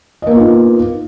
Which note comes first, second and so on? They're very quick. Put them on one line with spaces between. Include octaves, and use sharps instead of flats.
D#5 A#3 B3 F4 D#4